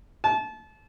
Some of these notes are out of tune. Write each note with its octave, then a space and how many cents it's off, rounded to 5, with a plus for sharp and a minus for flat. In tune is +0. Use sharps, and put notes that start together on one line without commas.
A5 -30